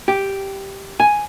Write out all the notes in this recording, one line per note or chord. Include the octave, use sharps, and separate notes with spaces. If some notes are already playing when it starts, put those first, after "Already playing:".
G4
G#5